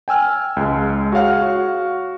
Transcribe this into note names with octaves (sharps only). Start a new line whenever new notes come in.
G5 G#5 E6 F6
C#2 G#3
F#4 G#4 C#5 F5 F#5 F6
F#4